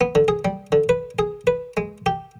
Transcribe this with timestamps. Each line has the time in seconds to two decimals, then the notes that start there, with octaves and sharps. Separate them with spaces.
0.01 B3
0.15 D3
0.28 G#4
0.45 G3
0.72 D3
0.89 B4
1.19 G#4
1.47 B4
1.77 G#3
2.06 G4